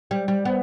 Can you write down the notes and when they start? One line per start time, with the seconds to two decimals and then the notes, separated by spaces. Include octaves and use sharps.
0.11 G3
0.28 G3
0.45 B3